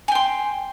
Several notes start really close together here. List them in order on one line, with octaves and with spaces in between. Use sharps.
G#5 G5 C6